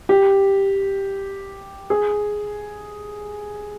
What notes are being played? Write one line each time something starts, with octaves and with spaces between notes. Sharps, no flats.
G4
G#4